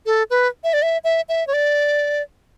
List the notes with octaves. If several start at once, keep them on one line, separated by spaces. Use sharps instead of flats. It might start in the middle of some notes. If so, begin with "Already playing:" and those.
A4
B4
E5
D5
E5
E5
E5
C#5
D5